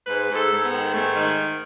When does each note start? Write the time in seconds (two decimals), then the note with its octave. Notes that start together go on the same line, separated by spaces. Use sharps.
0.07 G#2 B4
0.29 G#2
0.35 A4
0.51 G#2
0.65 B3
0.72 D#3
0.93 G#2 A3
1.16 D#3